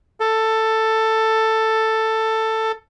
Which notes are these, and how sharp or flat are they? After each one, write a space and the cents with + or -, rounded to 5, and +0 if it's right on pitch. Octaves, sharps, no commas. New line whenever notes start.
A4 +10